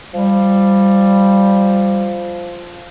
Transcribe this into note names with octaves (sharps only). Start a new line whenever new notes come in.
F3 G3